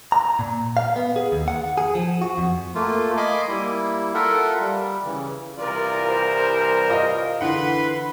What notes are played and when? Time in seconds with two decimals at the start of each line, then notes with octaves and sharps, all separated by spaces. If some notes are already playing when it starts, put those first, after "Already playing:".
0.12 A#5
0.39 A#2
0.77 F5
0.96 B3
1.16 G#4
1.32 D#2
1.48 F#5
1.78 G#4
1.95 F3
2.22 F#4
2.38 F2
2.75 A3 A#3 F4
3.17 D#5 G#5 B5 C6 D6
3.48 G3 A#3 E4
4.14 F4 A4 A#4 E5 F#5
4.60 G3
5.05 C#3 E3
5.57 C2 E3 F4 A#4 D5
6.07 G3 C5
6.90 F4 D#5
7.41 D3 E3 B4 F#5 B5 C6